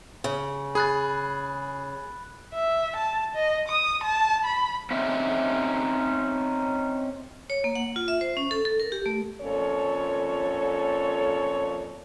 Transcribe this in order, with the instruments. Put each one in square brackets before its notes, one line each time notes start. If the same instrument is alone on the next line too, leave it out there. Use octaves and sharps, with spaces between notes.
[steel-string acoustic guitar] C#3
[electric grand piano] G#4 [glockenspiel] B5 F#6 A6
[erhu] E5
A5
D#5
D#6
A5
B5
[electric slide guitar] C4 C#4 D#4 E5
[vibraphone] C#5
A#3
F#5
F4
E5
C5
C#4
A4
A4
A#4
G4
A3
[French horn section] F2 A#2 C#4 A4 C#5